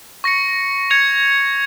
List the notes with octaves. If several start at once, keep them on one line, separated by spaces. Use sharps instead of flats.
C#6 A#6 C#7
G#6 C#7 F7